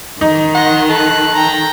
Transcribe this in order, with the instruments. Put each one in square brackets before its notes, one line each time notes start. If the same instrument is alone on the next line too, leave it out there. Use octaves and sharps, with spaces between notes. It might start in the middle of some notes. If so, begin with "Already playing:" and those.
[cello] D#3 [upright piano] D#4
[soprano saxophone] F#5 [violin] C6 A#6
[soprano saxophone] A4 [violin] F#6
[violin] G5 A#5